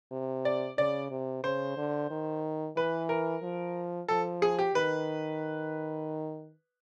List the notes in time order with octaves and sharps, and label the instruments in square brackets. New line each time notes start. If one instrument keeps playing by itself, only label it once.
[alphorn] C3
[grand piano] D5
[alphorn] C#3 [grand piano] D5
[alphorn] C3
[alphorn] C#3 [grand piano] C5
[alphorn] D3
D#3
[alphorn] E3 [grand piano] B4
[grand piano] A#4
[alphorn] F3
[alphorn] F3 [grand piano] A4
[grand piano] G#4
G4
[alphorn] D#3 [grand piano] B4